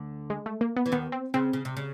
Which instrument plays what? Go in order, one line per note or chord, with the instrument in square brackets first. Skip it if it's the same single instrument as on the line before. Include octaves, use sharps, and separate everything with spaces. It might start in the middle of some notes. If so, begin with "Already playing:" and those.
Already playing: [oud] D2 D3
[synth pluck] G#3
A3
A#3
B3
[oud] E3
[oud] D#2 D#3 [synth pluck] B3
[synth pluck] C4
[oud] C#3 [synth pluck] C4
[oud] C#3
C3
C#3